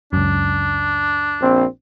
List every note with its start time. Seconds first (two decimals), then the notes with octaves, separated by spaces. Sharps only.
0.13 C#2 F#2 D4
1.41 A#1 C4